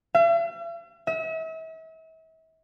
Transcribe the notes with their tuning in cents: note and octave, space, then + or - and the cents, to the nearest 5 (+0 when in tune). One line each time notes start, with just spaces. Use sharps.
E5 +45
E5 -40